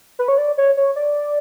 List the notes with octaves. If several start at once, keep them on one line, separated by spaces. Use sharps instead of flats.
B4
C#5
D5
C#5
C#5
D5